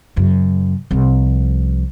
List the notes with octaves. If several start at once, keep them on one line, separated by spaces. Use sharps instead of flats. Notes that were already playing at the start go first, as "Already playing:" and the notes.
F#2 C#3
C2 F3